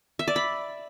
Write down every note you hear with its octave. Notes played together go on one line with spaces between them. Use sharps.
E5
D5
B5